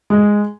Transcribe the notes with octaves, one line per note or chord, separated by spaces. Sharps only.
G#3